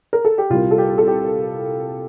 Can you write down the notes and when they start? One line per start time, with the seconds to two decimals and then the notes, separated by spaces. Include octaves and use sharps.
0.13 A#4
0.25 A4
0.38 G4
0.50 C2 A#2 G3 F4
0.71 A4
0.78 G4
0.98 A4
1.07 G4